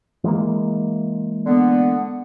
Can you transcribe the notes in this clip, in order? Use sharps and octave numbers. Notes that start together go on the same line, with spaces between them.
E3 G#3 A#3
D3 B3